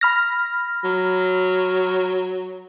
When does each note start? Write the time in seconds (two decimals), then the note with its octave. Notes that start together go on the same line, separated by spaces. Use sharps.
0.01 B5 F6 A#6
0.84 F#3